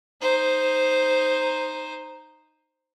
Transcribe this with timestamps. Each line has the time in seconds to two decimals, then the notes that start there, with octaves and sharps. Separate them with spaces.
0.22 D#4 C5